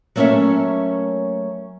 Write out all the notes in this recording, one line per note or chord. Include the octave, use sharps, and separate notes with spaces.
F#3 A3 A#3 C#4 C#5 E5